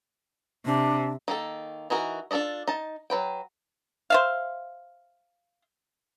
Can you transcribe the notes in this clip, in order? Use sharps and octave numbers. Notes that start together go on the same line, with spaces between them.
C3 D4
D#3 A#3 A4
E3 D#4 F#4 A#4
D4 F4 A4 D5 D#5
D#4 A5
F#3 B4 G5
C5 E5 F5